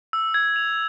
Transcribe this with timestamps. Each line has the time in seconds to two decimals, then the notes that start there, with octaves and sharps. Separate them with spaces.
0.13 E6
0.34 G#6
0.56 F7